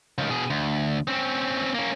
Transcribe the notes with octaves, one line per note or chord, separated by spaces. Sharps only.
C#2 D#3
B2 G#4
D2
C4 C#4
A#3 C#4